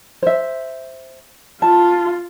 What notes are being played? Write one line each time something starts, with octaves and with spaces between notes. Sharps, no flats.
C5 E5
F4 A5